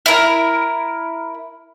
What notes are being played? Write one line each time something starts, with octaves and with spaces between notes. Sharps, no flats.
E4 A#4